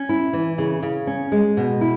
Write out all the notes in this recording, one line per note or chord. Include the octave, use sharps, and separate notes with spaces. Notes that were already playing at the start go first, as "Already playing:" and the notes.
Already playing: C#4
E4
E3
C#3
C#3
C#4
G#3
B2
E4